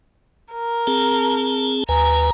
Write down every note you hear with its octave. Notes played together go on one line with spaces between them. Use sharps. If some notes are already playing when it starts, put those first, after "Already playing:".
A#4
C4 G#4 A5
D#2 B4 G#5 A#5